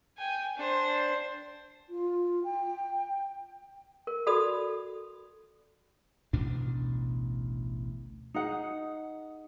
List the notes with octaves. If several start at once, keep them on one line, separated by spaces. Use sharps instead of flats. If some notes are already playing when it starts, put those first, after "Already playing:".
G5 G#5
D4 C5
F4
G5
A#4
F#4 A4 D5 B5 D#6
A1 D2 B2 D4
D#4 G#4 F#5